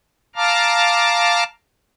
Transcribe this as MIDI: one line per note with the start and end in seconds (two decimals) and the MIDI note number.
0.36 1.44 77
0.36 1.44 81
0.36 1.44 82
0.36 1.44 86
0.36 1.44 89